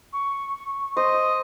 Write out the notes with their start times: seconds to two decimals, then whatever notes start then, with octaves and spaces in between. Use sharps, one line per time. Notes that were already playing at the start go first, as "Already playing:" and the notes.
0.12 C#6
0.97 C5 D#5